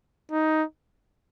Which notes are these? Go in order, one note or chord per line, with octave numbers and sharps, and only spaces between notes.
D#4